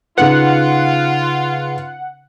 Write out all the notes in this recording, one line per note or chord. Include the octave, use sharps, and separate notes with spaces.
C#3 D#4 F4 B4 F#5